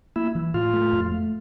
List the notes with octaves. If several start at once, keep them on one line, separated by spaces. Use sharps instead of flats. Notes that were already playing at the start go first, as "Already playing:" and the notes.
A#3 E4
E3
A2 F4
A3
F2
A3